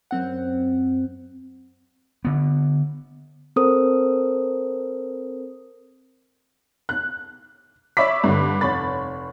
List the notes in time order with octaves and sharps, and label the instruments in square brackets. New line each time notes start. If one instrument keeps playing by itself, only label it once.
[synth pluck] F#2 C4 F#5
[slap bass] D3 B3
[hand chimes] C4 A4 A#4 C5 D#6
[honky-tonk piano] F#6
C#5 D5 E5 B5 D6 B6
G2 D3
F1 C#5 B5 A6